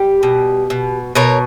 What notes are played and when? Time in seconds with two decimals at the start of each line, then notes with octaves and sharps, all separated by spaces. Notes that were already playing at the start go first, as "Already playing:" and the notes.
Already playing: G3 G4
0.23 B2
0.70 B2
1.15 B2 A#4 C#5